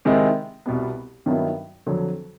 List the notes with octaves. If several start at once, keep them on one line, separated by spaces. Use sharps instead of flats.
C3 D#3 G#3 C4 E4
C2 B2 G3 B3
G2 D#3 F#3 B3 E4
F2 D3 F#3